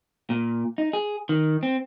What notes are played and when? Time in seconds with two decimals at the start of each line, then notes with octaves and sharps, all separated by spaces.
0.30 A#2
0.78 D#4
0.93 G#4
1.29 D#3
1.63 C4